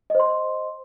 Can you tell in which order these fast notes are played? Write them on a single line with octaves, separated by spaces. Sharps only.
D#5 C5 C6